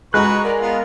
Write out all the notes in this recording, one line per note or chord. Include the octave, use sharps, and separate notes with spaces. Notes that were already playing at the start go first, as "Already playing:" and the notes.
G#3 F#4 B4 A#5 C#6 F#6
A#4 D5 F#5
B3 F4